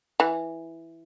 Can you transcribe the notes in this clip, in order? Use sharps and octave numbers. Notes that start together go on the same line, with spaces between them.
E3